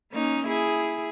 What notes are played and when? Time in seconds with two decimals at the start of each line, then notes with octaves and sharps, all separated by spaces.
0.12 A#3 C#4 D#4
0.47 E4 G#4